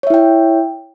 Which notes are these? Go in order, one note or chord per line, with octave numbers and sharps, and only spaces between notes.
E4 C#5 E5 G5